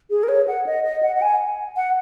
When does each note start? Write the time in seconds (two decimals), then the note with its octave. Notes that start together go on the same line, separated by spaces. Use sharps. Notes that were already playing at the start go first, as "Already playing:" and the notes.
0.10 G#4
0.23 A#4
0.29 C#5
0.48 F#5
0.67 D#5
0.85 D#5
1.03 F#5
1.16 F#5
1.22 G#5
1.76 F#5